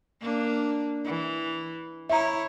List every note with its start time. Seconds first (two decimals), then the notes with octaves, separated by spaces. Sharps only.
0.21 A#3 D4
1.04 E3
2.10 E4 C#5 E5 A#5